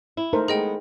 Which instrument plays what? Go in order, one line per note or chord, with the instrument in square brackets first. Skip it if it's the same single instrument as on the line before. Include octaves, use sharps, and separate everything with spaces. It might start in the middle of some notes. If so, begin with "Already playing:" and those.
[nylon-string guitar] E4
[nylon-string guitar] A3 [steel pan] D#4 A#4 C5
[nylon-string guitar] G#3 B3 [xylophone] G#4 D#5 G5